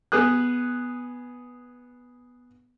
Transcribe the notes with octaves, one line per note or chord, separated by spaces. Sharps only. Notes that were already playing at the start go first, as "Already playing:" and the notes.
B3 G#4 D#6 F#6